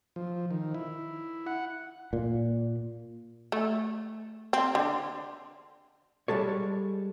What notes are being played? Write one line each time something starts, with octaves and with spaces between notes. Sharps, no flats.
F3
D#3
E4
F#5
A#2
A3
C4
D3
G3 G#3 A4 C#5